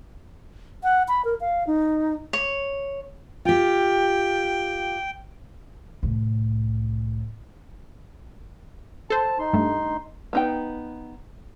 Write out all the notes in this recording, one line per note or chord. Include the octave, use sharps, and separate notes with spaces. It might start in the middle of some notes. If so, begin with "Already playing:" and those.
F#5
B5
A#4
F5
D#4
C#5
F4 G4 G5
C2 A2
A4 C5 A5
D#4 C6
G2 A3
B3 D#4 G5